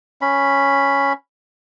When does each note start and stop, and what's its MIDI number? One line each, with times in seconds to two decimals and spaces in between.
0.21 1.13 61
0.21 1.13 83